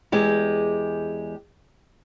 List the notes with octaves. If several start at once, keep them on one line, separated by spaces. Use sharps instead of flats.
E2 G#3 G4